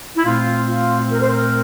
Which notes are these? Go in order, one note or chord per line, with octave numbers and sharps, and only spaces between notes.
E4
A#2 A3 C4 F4
F4
A#4
C5
A#4